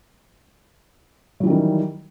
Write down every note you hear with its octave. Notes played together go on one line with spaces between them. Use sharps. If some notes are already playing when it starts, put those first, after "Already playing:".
D#3 E3 F#3 G3